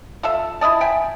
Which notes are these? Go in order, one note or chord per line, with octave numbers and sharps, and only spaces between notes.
F4 A4 E5
E4 F4 D#5 A5
E5 G5 G#5